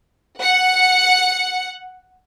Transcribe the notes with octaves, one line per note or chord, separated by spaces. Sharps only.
F#5 C#7